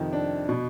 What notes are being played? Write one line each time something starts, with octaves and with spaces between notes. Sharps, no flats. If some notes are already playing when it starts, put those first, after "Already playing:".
Already playing: F2 C3 D#3
D4
B2